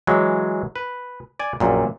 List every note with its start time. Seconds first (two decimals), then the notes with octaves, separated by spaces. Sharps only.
0.07 E3 F#3 G#3
0.76 B4
1.40 D5 G#5
1.60 A#1 F#2 A#2